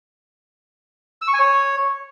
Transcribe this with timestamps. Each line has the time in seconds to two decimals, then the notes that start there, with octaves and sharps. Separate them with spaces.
1.22 E6
1.28 C#6
1.33 G#5
1.39 C#5